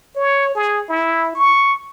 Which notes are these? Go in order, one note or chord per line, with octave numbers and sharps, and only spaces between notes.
C#5
G#4
E4
C#6